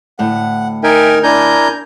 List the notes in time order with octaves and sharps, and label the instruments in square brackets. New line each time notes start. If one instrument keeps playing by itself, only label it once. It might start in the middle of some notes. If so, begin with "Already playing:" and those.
[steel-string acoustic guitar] D2 A2 [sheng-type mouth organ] F#5
[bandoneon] D#4 A#4 [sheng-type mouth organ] E5 [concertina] G5 G#5
[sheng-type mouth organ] D4 E4 [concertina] A#4 G#5 A#5 [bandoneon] G6